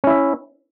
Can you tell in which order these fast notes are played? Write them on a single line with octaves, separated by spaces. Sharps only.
C#4 E4 E5